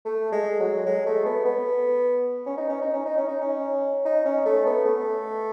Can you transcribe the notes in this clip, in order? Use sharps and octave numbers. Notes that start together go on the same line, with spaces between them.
A3
G#3
F#3
G#3
A3
B3
B3
C#4
D#4
C#4
D#4
C#4
D#4
C#4
D#4
C#4
D#4
C#4
A3
B3
A3